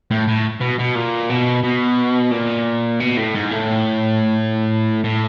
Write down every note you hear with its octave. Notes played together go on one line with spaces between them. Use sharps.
A2
A2
B2
B2
A#2
B2
B2
A#2
B2
A2
G#2
A2
A2